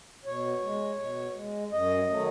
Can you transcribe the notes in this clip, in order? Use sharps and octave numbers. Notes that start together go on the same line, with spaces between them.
B2 C#5
G#3
B2
G#3
F#2 D#5
D#3 F#3 A3